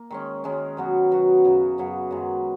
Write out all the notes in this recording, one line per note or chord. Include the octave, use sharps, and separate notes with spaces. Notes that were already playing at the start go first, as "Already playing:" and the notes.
Already playing: A#3
D#3 G#3 C#4
D#3 G#3 C#4
B2 F#3 B3 F#4
B2 F#3 B3 F#4
F#2 C#3 F#3 B3
F#2 C#3 F#3 B3
F#2 D#3 G#3